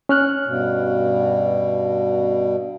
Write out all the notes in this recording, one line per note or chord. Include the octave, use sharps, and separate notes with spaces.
C#4 F6 F#6
G2 B2